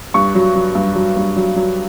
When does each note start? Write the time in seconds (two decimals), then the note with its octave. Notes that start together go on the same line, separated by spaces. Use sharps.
0.14 G2 C#6
0.35 F#3
0.56 F#3
0.75 G2
0.95 F#3
1.16 G2
1.36 F#3
1.56 F#3